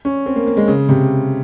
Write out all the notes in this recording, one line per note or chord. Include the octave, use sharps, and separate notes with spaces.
C#4
C4
A#3
A#3
G#3
C#3
C3